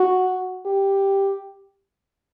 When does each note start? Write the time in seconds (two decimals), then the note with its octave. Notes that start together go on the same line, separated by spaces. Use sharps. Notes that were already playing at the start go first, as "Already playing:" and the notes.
Already playing: F#4
0.66 G4